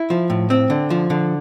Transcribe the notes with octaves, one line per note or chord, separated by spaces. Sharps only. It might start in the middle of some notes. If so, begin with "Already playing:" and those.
Already playing: E4
F3
A2
C4
D3
F3
D3